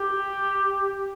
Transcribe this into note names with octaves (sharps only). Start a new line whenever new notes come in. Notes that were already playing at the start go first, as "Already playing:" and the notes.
Already playing: G4